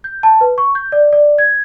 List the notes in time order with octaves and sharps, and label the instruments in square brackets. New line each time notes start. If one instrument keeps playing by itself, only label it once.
[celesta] G6
A5
B4
C#6
G6
D5
D5
G#6